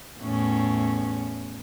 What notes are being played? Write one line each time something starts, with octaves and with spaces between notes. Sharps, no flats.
E2 A2 C#4